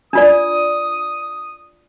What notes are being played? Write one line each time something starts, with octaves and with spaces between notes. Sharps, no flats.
D4 F4 D5 D#6